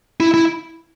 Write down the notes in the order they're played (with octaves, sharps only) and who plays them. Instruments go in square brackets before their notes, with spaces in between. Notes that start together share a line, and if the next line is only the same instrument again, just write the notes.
[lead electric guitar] E4
E4